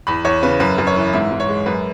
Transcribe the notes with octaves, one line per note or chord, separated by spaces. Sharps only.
E2 B5
E2 C#5
C#3 B4
F#2 B4
F#2
C#5
E3
G#2 E5
G#2
C#5
G#3
F#2 B4